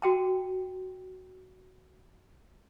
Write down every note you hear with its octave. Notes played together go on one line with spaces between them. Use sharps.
F#4 G5 A5